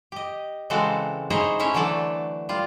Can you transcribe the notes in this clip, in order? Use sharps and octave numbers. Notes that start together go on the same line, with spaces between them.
G4 D#5
C#3 E3 G#3 C4 F#4 A4
D#4 E4 G#4 C5 C#5 D#5
A3 C#4 E4 C5 C#5
D3 E3 F#3 A4 D5
G3 F4